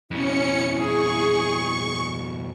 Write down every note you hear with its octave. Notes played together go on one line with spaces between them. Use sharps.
F2 B2 C#4 E4 C#7
G#4 C#6